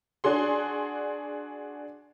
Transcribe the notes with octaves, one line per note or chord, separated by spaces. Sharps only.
D4 F#4 G#4 C6